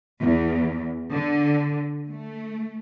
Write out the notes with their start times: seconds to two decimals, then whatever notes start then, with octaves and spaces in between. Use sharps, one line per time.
0.23 E2
1.13 D3
2.10 A3